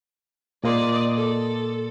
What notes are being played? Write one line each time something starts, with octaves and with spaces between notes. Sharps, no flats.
A#2 A#3 D5 D#5 C6
A4